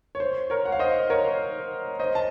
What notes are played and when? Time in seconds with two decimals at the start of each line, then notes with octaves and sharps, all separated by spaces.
0.15 C#5
0.20 C5
0.50 A#4 C#5
0.65 F#5
0.72 F5
0.79 C5 D#5
1.10 A#4 C#5
1.99 C5 D#5
2.15 A5